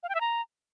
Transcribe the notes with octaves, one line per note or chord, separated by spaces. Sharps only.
F5
G5
E5
A#5